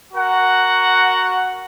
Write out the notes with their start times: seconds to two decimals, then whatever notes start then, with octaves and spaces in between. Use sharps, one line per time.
0.12 F#4 A#4 F#5